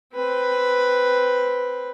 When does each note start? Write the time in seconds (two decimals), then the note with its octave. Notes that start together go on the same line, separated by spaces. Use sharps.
0.15 C4 B4